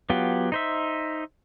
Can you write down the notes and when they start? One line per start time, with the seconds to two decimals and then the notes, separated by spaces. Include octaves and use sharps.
0.10 F#3 B3 F4 G4
0.52 D#4 C5 E5